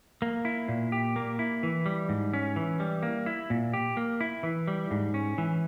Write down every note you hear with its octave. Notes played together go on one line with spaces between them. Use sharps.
A#3
E4
A#2
G4
A#3
E4
E3
G3
G#2
C#4
E3
G3
A#3
E4
A#2
G4
A#3
E4
E3
G3
G#2
C#4
E3